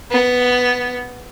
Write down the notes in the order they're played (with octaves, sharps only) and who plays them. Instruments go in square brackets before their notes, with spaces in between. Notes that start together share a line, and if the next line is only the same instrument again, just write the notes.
[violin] B3